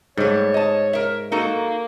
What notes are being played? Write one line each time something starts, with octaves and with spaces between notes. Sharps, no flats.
G#2 G3 A3 C#5
D#5 A5
A#4 E5
A#3 D#4 F#4 A4